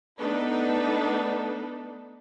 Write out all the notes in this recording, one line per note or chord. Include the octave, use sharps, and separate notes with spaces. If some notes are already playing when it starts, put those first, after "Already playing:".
A3 B3 D4 D#4 A4 B4